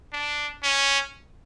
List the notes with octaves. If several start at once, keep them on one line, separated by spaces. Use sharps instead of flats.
D4
C#4